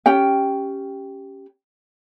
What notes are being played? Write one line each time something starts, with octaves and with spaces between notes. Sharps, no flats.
C#4 G4 G5